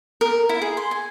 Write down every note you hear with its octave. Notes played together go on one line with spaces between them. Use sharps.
A#4
E4
G#4
C6
G#5